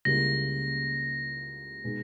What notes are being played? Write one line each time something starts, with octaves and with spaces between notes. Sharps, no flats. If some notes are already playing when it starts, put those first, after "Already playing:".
C#2 C#3 G3 A#3 E4 A#6
B2 G#3 D#4